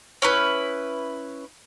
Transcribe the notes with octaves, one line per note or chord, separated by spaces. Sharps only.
C#4 E4 B4